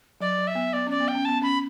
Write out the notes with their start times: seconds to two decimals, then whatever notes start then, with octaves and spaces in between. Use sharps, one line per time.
0.21 F#3 D5
0.38 F#3
0.47 E5
0.55 B3
0.73 B3 D5
0.87 C#4 D5
1.00 B3
1.08 G5
1.15 C#4
1.25 B3 A5
1.42 C#4 B5